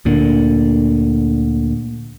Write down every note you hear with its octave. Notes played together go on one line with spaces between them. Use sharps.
D2 A#2 D3